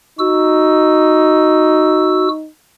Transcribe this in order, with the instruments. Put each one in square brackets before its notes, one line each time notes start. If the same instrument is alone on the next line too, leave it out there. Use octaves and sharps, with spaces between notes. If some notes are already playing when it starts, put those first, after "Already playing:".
[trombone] D#4 [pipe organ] F#4 E6